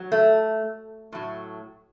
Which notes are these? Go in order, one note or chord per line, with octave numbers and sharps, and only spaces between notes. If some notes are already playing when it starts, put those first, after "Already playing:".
Already playing: F#3
A3
A2 F#3